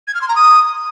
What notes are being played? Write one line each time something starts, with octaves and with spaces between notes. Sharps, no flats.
G#6
F6
C6
A#5
D#6